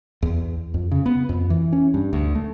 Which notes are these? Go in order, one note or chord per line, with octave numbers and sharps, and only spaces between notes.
E2
F2
C#3
B3
F2
E3
C#4
G2
D2
A3